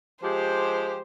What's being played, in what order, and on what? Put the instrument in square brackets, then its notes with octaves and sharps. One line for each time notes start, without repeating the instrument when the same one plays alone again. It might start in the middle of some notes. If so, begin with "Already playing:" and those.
[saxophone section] F3 G#3 G4 [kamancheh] C5